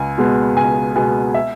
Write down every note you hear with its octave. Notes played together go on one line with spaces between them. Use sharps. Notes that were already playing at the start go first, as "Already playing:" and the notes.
Already playing: C#2 G#5
B2 G#3 B3
C#2 G#5
B2 G#3 B3 G#5
E5